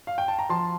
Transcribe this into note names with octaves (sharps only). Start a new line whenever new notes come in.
F5
G5
A5
A#5
F3 A5 C6